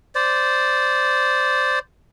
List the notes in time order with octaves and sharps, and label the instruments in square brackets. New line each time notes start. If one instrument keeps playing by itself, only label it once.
[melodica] C5 D5